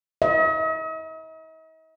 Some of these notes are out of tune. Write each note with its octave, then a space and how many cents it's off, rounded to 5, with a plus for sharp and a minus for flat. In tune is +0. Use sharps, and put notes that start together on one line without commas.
D#5 +45